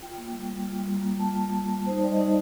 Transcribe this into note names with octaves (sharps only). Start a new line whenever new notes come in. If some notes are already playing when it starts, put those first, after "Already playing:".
F4 G5
A#3
G3
G3
F4
G3
A#3 A#5
F4
A5
F4
G3
A#3
G3
D#4 C5
G3 D5
D#5
D#4 F5